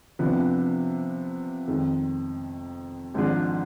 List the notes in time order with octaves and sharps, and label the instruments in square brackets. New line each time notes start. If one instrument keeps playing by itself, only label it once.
[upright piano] C3 F3 B3 D4
F2 D#3 G#3
G#1 G#2 F3 G#3 D4